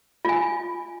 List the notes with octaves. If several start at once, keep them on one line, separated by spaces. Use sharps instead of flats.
F4 G#5